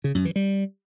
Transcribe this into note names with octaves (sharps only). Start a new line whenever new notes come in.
C#3
F#2
E3
G3